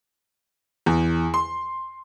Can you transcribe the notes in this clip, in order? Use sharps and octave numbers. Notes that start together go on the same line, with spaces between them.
E2
C6